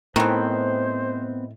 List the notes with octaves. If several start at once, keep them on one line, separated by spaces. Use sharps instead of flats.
A2 D#3 E3 B3 C4 C5